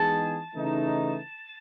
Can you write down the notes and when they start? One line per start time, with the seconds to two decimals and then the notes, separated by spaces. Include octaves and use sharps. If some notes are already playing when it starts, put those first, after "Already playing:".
Already playing: E3 G#3 B3 D#4 G#4 A5
0.55 C#3 E3 A3 D#4